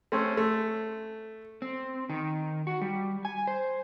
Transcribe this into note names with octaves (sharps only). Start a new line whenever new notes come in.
A3 C4 C#4
A3
C4
D#3
F#4
G3
G#5
C5